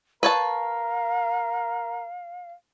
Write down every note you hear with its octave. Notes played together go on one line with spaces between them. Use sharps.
A#4 B4 C#5 F5 A5